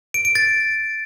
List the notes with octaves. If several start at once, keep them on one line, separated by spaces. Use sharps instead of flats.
D7
D7
A6